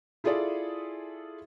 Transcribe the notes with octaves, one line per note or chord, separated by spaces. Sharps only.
E4 F4 G#4 A4 D5 E5